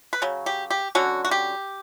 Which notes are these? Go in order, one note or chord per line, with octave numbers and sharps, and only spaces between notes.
B4
C#3 F#3
G4
G4
D3 F#3 C#4 F#4
F#4
G4